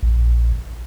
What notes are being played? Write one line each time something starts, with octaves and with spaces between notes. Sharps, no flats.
A#1